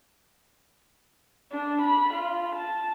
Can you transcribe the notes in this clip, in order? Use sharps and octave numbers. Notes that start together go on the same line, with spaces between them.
D4
B5
F4
A5